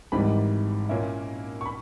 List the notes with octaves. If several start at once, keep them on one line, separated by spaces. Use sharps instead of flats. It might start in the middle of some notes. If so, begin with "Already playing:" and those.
G#1 G#2 E3 G3 B5
A#2 A#3 C#4 E4
C#6
B5